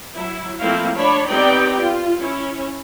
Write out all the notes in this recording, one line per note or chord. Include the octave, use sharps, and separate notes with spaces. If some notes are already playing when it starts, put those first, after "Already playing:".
F#3 E4
F3 A3 A#3 C4 E4 F5
D4 C#5 B5
B3 C4 D#4 G4 D5 G5
F4
C#4 E4